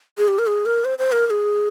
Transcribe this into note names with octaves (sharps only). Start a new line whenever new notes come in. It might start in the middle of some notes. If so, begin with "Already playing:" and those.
G#4
G4
A#4
G#4
A#4
C5
C5
A#4
A#4
G#4